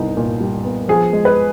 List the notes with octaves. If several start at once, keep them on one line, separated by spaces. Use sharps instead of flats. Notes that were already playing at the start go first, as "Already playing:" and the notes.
Already playing: C2 G3 B3 D#4
A#2
G3
B3
F3 G#4
G#3
B4